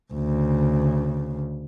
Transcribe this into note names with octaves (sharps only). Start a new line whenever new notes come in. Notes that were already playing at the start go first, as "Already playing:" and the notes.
D2 C#3